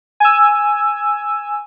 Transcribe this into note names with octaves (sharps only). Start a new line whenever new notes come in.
G#5 E6